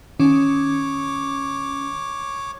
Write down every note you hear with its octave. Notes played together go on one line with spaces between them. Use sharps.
D#3 C#4 C#5 D6